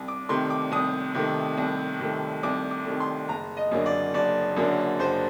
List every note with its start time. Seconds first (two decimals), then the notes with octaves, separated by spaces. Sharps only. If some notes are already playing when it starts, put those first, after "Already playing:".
Already playing: C2
0.08 D6
0.29 C3 D#3 A3 C6
0.50 D6
0.72 C2 D#6
1.14 C3 D#3 A3
1.58 C2
2.00 C3 D#3 A3
2.43 C2 D6
2.71 D6
2.86 C3 D#3 A3
3.00 C6
3.28 F#1 A#5
3.57 D#5
3.71 F#2 D3 F#3 A#3
3.86 D5
4.14 F#1 D5
4.57 F#2 D3 F#3 A#3
4.99 F#1 C5